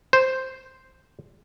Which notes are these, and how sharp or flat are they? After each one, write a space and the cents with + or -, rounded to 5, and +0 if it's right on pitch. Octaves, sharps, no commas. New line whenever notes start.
C5 -5